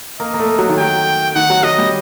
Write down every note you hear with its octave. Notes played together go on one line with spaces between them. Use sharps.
A#3 D#5
A#3
A3
F#3
D#3
F#3 G5
D#3 F#5
F#3
F#3 D#5
G3